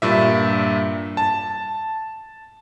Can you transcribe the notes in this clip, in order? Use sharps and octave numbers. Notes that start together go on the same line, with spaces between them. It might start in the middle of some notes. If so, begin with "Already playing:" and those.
G2 A#2 E5
A5